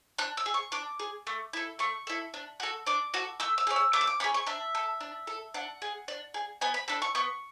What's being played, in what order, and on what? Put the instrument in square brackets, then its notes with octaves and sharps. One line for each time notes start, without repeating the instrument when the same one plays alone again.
[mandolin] D4 F#6
E6
G#4
C#6
D4 D6
G#4
A3
E4 A4
A3 C#6
E4 A4
D4
F#4 A4
D4 D6
F#4 A4
A3 E6
E6
C#4 G#4
E6
A3 D6
E6
D6
C#4 G#4 B5
C#6
D4 E5
A4
D4
A4
D4 F#5
G#4
D4
G#4
B3 G#5
B5
D4 A4 B5
C#6
B3 C#6